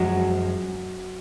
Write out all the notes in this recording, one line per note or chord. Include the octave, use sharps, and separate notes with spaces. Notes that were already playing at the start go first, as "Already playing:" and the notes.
Already playing: F#2 F3 F#3 G#3